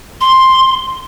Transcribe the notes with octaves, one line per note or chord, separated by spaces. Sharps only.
C6